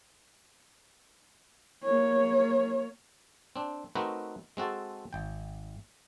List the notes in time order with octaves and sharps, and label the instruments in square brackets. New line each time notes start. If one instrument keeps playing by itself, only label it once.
[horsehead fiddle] A#3 C#5
[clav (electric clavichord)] C4 D4
A3 C4 D#4 F#4 A#4 B4
G#3 C4 F#4 A4 A5
G#1 G5